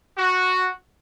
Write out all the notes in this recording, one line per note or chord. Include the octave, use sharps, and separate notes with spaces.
F#4